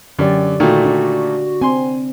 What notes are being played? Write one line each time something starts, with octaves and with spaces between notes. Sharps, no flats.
F#2 D3 G4 D5
A#2 D#3 A3 F#4
D4 D5
C4 G#5 C6